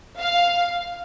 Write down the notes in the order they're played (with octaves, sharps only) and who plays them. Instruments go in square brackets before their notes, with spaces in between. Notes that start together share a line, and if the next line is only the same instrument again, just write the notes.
[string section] F5